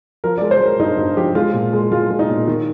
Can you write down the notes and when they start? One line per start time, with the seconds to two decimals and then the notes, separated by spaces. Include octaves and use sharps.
0.24 F3 A#4
0.38 G#3 D5
0.51 C5
0.60 G#3
0.66 A#4
0.79 G2 D#4
0.98 G2
1.17 F3 G4
1.35 G#3 F4
1.54 A#2
1.73 G#3
1.92 G#3 F4
2.10 G#3
2.19 D#4
2.29 A#2
2.47 D#3